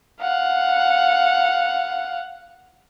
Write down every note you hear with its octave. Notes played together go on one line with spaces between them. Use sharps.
F5 F#5